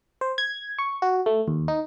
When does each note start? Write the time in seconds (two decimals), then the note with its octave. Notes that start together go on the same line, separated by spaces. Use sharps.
0.21 C5
0.38 G#6
0.79 C#6
1.02 F#4
1.26 A3
1.48 D#2
1.68 D#4